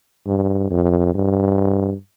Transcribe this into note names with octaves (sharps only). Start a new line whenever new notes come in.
G2
F2
G2